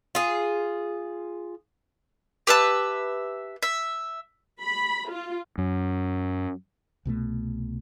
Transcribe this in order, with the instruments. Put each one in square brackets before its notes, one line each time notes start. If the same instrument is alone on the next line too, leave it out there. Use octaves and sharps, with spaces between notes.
[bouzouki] F4 G#4
[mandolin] G4 B4 E5 A5
E5
[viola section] B5
F4
[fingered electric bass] F#2
[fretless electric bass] C2 B2 F3 A3